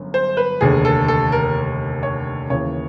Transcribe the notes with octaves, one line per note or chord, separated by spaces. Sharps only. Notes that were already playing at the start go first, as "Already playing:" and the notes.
Already playing: G1 F#2
C5
B4
F1 D#2 D3 G#4
A4
A4
A#4
C#5
D#2 C#3 E3 C#5